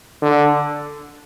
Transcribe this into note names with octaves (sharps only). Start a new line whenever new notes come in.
D3